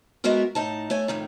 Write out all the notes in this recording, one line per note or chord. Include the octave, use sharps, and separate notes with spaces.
G#3 B3 E4 F#4 A#4
A2 D#4 A5
A3 C#5 G#5
F2 A2 D#3